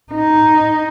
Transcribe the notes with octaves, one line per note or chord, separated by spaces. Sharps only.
D#4